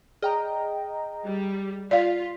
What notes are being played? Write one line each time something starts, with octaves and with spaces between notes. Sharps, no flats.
G#4 D#5 G5 A#5
G3
F4 D5 F5 B6